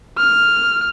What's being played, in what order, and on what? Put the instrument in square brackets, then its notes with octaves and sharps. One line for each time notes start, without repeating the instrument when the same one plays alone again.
[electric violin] F6